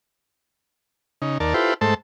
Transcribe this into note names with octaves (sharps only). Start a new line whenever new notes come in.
C#3 D#4
D#2 A#4 D5 A5
E4 F4 G4 A4 B4 C5
G#2 A3 A4 C5 A5